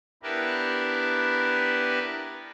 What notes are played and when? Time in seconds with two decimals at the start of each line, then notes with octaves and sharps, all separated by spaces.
0.23 B3 D4 E4 G4 A#4 B4